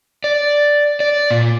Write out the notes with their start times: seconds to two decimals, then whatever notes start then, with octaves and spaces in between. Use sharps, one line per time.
0.24 D5
1.00 D5
1.31 A#2